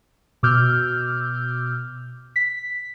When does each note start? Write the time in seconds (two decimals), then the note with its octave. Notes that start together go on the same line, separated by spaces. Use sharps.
0.43 B2 D6 E6 F6 G6
2.36 B6